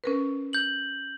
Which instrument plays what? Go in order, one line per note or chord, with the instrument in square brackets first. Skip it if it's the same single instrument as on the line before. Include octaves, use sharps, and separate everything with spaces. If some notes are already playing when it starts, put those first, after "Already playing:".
[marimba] C#4 A#4 B4
[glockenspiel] G6 F#7